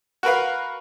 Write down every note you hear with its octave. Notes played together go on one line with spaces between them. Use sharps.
F#4 A#4 B4 F5